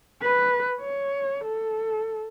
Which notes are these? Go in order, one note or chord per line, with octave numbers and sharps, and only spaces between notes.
B4
C#5
A4